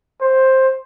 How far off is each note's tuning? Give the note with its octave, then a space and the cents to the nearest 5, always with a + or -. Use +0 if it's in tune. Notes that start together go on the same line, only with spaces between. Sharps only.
C5 +10